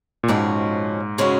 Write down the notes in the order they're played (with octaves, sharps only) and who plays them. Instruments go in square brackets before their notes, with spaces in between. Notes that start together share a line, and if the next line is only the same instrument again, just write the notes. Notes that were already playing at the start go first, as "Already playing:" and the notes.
[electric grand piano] A#2
[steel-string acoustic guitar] F2 C#3 G#3 C#4 F#4 [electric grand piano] G#2
[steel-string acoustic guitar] C#3 G#3 C#4 F#4